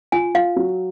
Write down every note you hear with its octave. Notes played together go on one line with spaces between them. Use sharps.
F4 G#5
F4 F5
F#3